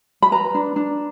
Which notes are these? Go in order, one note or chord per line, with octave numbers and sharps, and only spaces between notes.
B5
B4 A#5
D4
D4